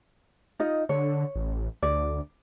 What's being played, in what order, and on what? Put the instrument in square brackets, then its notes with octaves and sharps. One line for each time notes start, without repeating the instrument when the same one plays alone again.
[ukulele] D#4 F4 D#5
[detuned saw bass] D3 [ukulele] C#5
[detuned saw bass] A1
[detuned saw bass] D2 [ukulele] D5